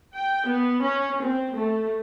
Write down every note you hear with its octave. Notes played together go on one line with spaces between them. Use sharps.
G5
B3
C#4
C4
A3